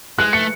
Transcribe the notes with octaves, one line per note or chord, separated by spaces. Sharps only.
G#3 F#6
A3 C#7